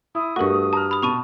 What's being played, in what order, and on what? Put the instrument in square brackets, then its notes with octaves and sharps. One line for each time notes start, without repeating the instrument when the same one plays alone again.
[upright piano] E4 [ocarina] D#6
[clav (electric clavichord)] G2 F#4 [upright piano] A3 [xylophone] A#4 C#6
[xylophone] A5 [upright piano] A#5 F6
[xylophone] B5 D#6
[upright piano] B2 [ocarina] A5 [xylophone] B5 C#6 D#7